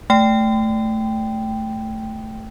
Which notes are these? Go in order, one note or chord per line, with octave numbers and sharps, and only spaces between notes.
A3 G5